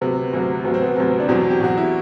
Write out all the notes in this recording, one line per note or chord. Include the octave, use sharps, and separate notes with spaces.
D2 C3 F#3 B3
D2 C3 F#3
D2 C3 F#3 B3
C4
B3
D2 C3 F#3
D4
E2 B2 F#3 C4
G4
E2 B2 F#3 F#4
E4